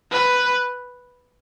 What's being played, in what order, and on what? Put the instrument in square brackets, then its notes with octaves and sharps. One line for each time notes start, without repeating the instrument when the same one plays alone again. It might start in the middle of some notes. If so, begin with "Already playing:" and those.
[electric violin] B4